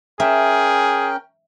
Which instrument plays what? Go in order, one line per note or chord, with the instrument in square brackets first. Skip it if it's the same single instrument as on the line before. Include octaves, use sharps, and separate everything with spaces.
[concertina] C#4 A#4 G5 [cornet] G#4 [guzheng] E5